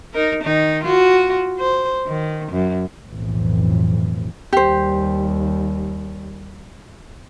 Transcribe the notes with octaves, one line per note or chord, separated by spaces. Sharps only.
D#4 A#4
D#3 D#4
F4 F#4
C5
D#3
F#2
B1 F2 A2 E3
D#2 G3 G4 C5